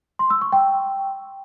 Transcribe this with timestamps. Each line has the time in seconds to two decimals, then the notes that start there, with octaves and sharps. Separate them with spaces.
0.19 C6
0.30 E6
0.41 C#6
0.52 G5